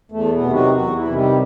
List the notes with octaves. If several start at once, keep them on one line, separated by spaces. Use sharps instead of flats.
E2 A3
B2 B3
C3 D#3
F#3 F#4
E2 F#3 F#4
E3 E4
C3 D#3
G3